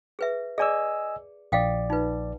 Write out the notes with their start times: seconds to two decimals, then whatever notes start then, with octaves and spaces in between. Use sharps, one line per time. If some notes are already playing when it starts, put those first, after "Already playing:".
0.19 G#4 B4 E5
0.58 G#4 D5 D#5 G#5 D6 E6
1.52 A#1 D5 F5 G5 D#6
1.90 D#4 F4 B4